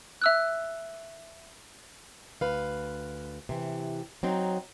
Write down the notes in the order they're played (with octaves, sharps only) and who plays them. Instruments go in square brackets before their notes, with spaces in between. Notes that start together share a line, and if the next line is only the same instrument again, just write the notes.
[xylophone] E5 E6 F#6
[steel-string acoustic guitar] D2 B4 F5
C3 E3
F#3 C4 D#4